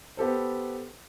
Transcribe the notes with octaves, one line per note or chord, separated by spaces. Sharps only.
B3 G4 A4 C5